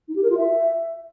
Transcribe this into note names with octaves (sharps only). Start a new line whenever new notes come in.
D#4
G4
A#4
F4
E5